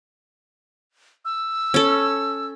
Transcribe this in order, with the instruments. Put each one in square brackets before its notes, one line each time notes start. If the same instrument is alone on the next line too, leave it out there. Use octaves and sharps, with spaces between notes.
[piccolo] E6
[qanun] C#4 A4